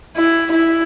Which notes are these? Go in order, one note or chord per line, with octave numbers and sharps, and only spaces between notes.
E4
E4